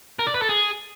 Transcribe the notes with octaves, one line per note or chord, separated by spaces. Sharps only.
A#4
D5
B4
A4
G#4